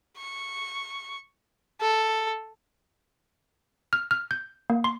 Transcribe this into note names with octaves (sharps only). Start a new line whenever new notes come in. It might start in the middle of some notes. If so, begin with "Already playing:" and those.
C#6
A4
F6
F6
G6
A#3
C6